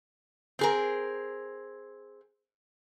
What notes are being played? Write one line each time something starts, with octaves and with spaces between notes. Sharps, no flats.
C4 G#4 A#4